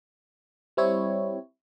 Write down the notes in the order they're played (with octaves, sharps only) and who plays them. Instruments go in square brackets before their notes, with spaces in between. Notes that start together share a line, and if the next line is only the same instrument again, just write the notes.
[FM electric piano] G3 C4 E4 C#5